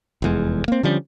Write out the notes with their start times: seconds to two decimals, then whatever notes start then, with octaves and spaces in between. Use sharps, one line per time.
0.22 F1 E2 G#3
0.68 A#3 C4
0.83 D3 F3 G3 C#4